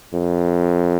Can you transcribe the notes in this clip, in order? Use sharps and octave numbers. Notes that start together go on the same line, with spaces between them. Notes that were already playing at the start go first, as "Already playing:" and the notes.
F2